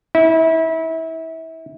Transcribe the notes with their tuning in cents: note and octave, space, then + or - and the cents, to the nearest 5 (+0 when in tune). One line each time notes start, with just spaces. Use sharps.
E4 -30